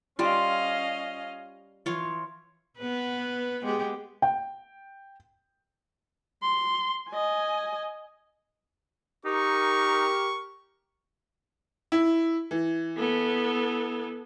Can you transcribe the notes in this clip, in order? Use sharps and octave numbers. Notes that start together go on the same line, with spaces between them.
G3 C#4 F4 D#5 F5
E3 F4 C#5
B3 B4
G#3 B3 G4
G5
C6
D#5 G#5
D#4 G4 A#4 C#6
E4
E3
B3 A4